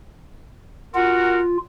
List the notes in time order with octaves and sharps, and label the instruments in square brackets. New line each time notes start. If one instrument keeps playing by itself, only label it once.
[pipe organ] F4 [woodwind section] F#4 A#4 F#5